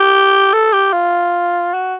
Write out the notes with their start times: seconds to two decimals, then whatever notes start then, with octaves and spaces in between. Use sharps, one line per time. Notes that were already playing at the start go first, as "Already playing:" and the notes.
Already playing: G4
0.53 A4
0.73 G4
0.93 F4
1.74 F#4